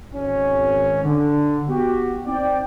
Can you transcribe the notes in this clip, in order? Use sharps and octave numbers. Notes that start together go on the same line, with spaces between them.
G#1 C#4
D3
B3 F#4 G4
C4 D#4 D5 G5